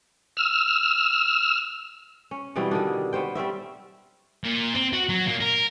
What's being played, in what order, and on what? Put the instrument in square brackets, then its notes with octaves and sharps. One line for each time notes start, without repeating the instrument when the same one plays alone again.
[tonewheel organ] E6 F6
[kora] C#4
B2 E3 G3 C4
D3 D#3 D4
B3 C#4 C5 G5
G3 C4 C#4 E5
[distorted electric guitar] A#2
C4
F#4
F#3
A#2 A#3
A#4